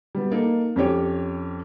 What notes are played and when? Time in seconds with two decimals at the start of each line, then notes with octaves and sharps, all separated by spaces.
0.15 G3 B3
0.32 A#3 D#4 A4
0.76 F2 C#4 G4 C#5